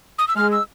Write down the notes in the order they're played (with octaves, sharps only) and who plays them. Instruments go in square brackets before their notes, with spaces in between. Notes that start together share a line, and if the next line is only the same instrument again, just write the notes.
[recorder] D#6
E6
[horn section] G#3 [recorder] F6
[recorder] E6